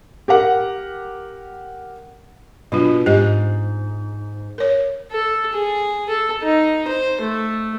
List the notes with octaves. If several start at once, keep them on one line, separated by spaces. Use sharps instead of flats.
G4 A#4 F#5
B2 F#3 D4 F4
G#2 G4 D#5
A#4 C#5
A4
G#4
A4
D#4
C5
A3